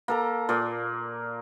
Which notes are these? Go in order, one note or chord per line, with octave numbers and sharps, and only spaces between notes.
A#3 A4 A#5
A#2 D5